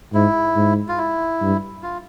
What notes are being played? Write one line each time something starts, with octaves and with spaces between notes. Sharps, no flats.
G#2 E4
G#2
F4
E4
G2
F4